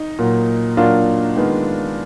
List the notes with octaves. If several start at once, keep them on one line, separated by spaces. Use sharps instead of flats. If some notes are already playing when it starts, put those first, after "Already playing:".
Already playing: D#4
A#2 F#3 A#3
A#2 F#3 A#3 D4 F4
D#3 G#3 B3